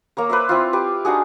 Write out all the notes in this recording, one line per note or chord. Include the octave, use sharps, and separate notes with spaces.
A#3 C#5 A#5
B4 C5 D5 E5
C4 E4 F4
G4 B4
D4 D#4 F#4 G#4